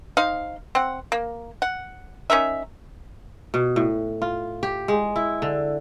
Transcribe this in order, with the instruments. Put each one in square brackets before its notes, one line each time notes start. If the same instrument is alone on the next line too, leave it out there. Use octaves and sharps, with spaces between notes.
[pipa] D#4 C5 F5
C4 F#5
A#3
F#5
C#4 D#4 A#4 E5
[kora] B2
A2
F4
G4
G#3
E4
D3